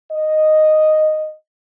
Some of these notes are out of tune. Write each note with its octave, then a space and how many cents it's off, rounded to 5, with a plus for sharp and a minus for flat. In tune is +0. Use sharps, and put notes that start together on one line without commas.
D#5 -5